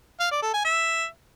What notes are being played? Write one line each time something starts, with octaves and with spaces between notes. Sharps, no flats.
F5
D5
A4
G#5
E5